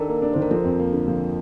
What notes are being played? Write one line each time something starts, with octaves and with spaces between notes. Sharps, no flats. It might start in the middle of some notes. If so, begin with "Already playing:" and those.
Already playing: D#3 D4 A4 A#4
A#3
D4
D#3 C5
A#4
F3 A4
F2
A#3
D3
F3